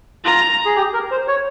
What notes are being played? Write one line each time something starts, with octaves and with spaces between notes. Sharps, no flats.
F4 A#5
G#4
G4
A#4
C5
C#5